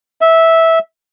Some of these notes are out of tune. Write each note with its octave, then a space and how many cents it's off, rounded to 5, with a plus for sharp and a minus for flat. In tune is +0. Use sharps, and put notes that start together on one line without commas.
E5 -10